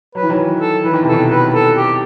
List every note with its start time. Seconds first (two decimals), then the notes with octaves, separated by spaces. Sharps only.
0.15 F#3 B4
0.23 E3
0.29 D#3 F#3
0.61 A4
0.84 E3 B4
0.93 D#3
1.02 C3
1.08 B2 D#3 A4
1.30 B4
1.54 A4
1.77 G4